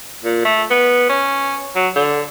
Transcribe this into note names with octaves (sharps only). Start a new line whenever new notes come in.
A#2
A3
B3
C#4
F#3
D3